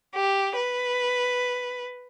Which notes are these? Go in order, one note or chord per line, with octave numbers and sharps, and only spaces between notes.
G4
B4